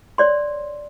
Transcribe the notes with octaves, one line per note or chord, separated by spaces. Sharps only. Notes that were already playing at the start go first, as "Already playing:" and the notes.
C#5 D5 C6